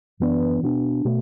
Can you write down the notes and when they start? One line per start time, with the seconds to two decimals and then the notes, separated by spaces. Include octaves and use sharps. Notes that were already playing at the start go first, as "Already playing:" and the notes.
0.20 F#2 E3 B3 D4
0.63 B2 B3 D4
1.05 B2 A3